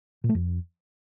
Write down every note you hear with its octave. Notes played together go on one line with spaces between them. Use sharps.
A#2
A3
F2